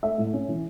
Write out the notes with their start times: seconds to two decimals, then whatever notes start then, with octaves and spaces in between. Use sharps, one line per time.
0.03 A3 E5
0.18 A2
0.33 C#4
0.48 E3